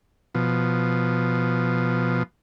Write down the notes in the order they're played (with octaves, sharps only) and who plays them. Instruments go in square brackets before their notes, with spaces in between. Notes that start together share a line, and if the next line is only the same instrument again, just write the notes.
[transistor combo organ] B2 F3